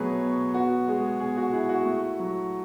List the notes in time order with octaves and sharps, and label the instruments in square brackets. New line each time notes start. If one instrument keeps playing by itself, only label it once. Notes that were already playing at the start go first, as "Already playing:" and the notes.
Already playing: [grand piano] B2 F#3 A3 G#4 B4 C#5
B2
B3 F#4
G#3 G#4
B2 G#4
F#4
E4 G#4
F#4
A3
F#3